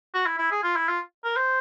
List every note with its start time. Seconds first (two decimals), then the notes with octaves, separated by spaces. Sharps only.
0.14 F#4
0.26 E4
0.38 E4
0.51 G#4
0.63 F4
0.76 E4
0.88 F4
1.24 A#4
1.36 C5